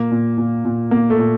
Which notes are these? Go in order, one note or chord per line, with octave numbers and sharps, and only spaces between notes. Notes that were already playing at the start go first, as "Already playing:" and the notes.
Already playing: A#2 A#3
A#2
A#2
A#2
A#2 A#3
A3
A#2